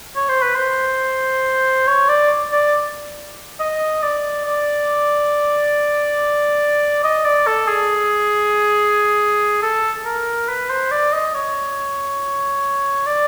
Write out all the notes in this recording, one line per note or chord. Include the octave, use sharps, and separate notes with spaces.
C#5
C5
B4
C5
C#5
D5
D5
D#5
D5
D5
D#5
D5
A4
G#4
A4
A#4
B4
C5
D5
D#5
C#5
D5